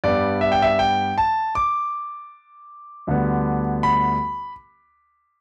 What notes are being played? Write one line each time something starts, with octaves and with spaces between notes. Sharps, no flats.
G2 G3 B3 D5
E5
G5
E5
G5
A5
D6
D2 D3 G3 B3
B5